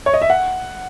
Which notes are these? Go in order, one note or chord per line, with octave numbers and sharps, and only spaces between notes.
C#5
D#5
E5
F#5